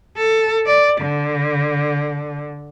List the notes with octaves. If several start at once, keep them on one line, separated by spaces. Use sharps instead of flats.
A4
D5
D3